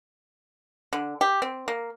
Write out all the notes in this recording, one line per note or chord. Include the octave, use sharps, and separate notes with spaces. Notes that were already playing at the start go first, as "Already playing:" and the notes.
D3
G4
C4
A#3